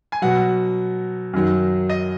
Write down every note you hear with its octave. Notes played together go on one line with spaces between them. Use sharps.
G#5
B2 F#3 F#5
F#2 D#3 F#3
D#5